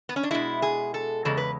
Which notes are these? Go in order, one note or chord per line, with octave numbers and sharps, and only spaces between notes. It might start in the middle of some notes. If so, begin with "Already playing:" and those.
B3
C#4
D4
B2 G#3 E4
G#4
A4
E2 C#3 G#3 A4
B4